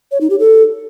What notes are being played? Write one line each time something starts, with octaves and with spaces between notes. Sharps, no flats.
C#5
D#4
G4
A4